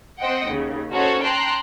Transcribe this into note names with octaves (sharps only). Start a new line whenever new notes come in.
C4 C5 D#5 F#5 G5
D#2 C#3
C#4 D#4 F#4 A4 C5 C#5
G5 A5 A#5 C6 F#6